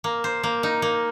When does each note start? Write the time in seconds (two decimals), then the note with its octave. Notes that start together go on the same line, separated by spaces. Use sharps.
0.04 A#3
0.24 C5
0.43 A#3
0.63 D#4
0.82 A#3